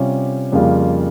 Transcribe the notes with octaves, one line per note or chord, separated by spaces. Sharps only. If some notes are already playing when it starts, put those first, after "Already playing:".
Already playing: C3 G3 C#4 F4
F2 C#3 G3 A#3 F4